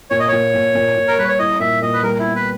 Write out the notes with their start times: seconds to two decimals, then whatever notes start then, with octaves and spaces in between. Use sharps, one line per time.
0.10 A#2 C#5
0.20 D#5
0.28 A#2 C#5
0.54 A#2
0.75 A#2
0.96 A#2
1.08 A#4
1.18 G3 B4
1.28 C#5
1.39 E4 D#5
1.60 A#2 E5
1.82 A#2 D#5
1.93 B4
2.03 G3 A#4
2.19 E4
2.24 B3
2.35 B4